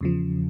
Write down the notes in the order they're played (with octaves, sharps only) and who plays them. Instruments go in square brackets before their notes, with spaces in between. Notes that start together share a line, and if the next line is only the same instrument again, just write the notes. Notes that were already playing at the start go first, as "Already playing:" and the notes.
[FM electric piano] E2 C#3 F3